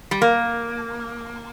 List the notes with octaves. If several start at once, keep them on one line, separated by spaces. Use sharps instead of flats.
G3
A#3